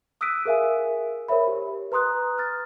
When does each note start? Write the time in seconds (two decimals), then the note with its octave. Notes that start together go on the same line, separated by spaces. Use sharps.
0.21 D#6 E6 F#6 B6 D7 D#7
0.45 G#4 A#4 E5 F5 G#5
1.28 A#4 C5 C#5 E5 B5
1.47 G4
1.92 B4 A#5 C6 D#6 F#6
2.38 F6 A6